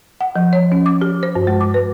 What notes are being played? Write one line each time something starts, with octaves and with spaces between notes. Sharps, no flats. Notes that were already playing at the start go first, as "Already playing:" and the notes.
F#5
F3
C#5
C#4
D6
G4
C5
G2
G#3
D6
B4